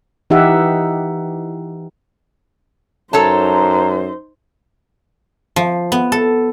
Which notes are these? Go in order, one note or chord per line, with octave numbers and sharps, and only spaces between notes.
E3 D#4 G4 E5 F#5
F#2 D#4 A4 C5 C#5 A5 A#5
F3
B3
A4